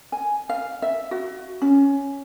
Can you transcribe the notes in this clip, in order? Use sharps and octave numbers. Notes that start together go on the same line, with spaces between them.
G#5
F5
E5
F#4
C#4